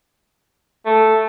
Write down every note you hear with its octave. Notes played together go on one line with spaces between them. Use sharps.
A3